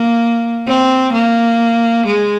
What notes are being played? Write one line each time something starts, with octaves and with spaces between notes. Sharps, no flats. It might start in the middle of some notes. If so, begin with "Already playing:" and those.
Already playing: A#3
C4
A#3
G#3